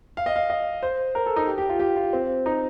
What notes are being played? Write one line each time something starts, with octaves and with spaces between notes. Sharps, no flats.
F5
D#5
F5
D#5
C5
A#4
A4
D#4
G4
G4
F4
G4
F4
C4
D#4